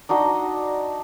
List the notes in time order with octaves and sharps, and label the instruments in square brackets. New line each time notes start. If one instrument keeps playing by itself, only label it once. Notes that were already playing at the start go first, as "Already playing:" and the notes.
[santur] D4 D#4 F#4 D#5